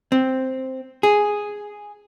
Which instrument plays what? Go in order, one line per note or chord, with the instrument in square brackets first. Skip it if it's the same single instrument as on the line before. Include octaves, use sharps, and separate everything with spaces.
[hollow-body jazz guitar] C4
G#4